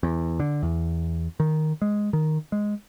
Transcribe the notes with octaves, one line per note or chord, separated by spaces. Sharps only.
E2
D3
E2
D#3
G#3
D#3
G#3